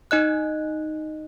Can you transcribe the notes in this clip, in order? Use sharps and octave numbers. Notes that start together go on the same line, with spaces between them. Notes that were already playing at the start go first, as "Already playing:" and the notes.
D#4 D#5 F#6